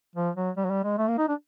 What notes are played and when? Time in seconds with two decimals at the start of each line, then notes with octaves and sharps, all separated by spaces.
0.16 F3
0.36 F#3
0.57 G3
0.65 F#3
0.71 G3
0.84 G#3
0.98 A3
1.08 A#3
1.18 D#4
1.28 D4